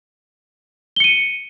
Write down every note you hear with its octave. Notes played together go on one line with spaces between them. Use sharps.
C#7 D#7 G7